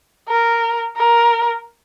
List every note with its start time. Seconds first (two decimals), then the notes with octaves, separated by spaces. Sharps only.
0.28 A#4
0.97 A#4